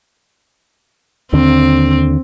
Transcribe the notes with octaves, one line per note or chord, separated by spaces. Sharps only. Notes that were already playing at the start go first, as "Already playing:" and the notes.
D#2 D3 C4